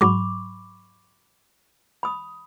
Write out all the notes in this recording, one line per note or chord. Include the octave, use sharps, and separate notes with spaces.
G#2 F#3 B5 C#6 D6
B5 D#6